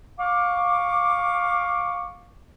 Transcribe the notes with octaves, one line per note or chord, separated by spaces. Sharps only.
F5 C#6 D6